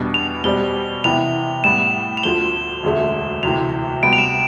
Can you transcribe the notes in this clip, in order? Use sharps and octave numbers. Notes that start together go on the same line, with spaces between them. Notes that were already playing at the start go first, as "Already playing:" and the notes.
Already playing: E2 B2 G3 D4
F7
B2 G3 C4 G4 D5 G7
C3 E3 B3 E4 F7
A2 G3 B3 E7
F7
D2 D3 F3 G7
E1 D2 D3 A3
D2 C3 E3 F7
C3 G3 B3 D7
F7
E7